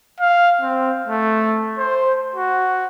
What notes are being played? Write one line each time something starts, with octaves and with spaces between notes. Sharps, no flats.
F5
C4
A3
C5
F#4